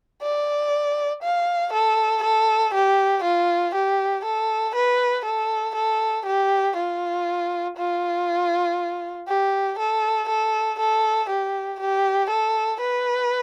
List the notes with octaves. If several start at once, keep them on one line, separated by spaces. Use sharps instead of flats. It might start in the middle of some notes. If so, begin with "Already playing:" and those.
D5
F5
A4
A4
G4
F4
G4
A4
B4
A4
A4
G4
F4
F4
G4
A4
A4
A4
G4
G4
A4
B4